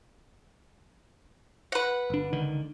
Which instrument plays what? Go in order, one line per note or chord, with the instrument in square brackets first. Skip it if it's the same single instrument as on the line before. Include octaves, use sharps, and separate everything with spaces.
[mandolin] B4 F#5
[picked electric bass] G1 D4
C#2 D3 D#3